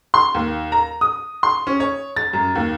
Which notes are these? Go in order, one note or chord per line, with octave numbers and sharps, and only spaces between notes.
C6
D#2
A#5
D#6
C6
C#4
C#5
A6
F#2
D#2